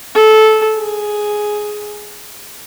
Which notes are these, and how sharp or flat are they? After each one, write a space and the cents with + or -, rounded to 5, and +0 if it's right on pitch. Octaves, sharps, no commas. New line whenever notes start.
A4 -15
G#4 +5